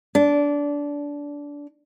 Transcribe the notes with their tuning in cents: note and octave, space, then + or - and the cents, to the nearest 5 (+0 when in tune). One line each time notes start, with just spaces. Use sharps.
D4 -20